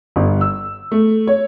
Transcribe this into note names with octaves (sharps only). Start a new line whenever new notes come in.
G1
E6
A3
C#5